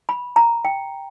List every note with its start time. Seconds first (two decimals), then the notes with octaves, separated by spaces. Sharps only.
0.09 B5
0.36 A#5
0.65 G5